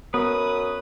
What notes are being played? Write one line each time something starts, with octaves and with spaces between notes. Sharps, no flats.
F#2 B3 B4 D#6